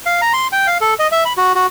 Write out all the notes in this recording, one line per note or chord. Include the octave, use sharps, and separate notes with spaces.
F5
A#5
C6
G5
F5
A4
D#5
E5
B5
F#4
F#4